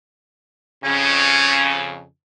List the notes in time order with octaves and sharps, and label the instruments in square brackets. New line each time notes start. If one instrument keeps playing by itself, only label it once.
[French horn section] F2 C#3 [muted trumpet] C#4